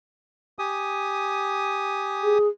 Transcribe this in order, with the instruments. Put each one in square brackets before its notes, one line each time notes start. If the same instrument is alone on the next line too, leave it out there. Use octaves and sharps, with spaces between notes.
[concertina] G4 G#5 D#6
[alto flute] G#4